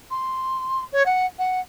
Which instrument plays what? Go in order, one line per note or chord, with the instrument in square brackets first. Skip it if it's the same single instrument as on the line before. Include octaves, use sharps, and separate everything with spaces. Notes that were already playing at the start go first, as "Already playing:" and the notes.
[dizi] C6
C#5
F#5
F#5